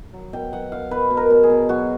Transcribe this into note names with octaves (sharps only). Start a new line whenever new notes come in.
F#3
B2 G5
F#3 F#5
B2 F5
B2 B4
B2
A#4
B2
G#4
B2
F#3 F#4